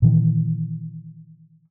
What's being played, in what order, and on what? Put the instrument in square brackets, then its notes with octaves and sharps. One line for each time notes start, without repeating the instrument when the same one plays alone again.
[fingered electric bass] A#2 D#3 E3